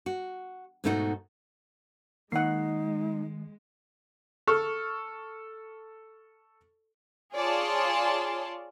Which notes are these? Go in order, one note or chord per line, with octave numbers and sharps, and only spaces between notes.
F#4
G#2 B2 A3 D#4 E4 F#4
D#3 G#3 A#3 D#4 F#5 C7
A4 C#6 F6
F4 G#4 C#5 D5 A5 C6